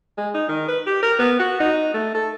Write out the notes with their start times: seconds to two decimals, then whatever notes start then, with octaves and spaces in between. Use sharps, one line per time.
0.18 G#3
0.35 D#4
0.49 D#3
0.68 B4
0.87 G4
1.03 A#4
1.19 B3
1.40 F#4
1.60 D#4
1.94 A3
2.15 A4